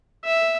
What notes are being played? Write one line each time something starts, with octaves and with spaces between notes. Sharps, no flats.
E5